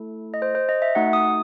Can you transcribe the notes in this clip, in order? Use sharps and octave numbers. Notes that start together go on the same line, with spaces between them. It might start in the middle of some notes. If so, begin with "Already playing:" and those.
Already playing: A3 E4 A4
D#5
C5
C5
D#5
E5
A3 D#4 F#4 F#5
D#6